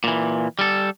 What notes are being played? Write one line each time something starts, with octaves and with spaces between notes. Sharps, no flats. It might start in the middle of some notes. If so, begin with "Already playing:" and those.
A#2 E3
G3 A4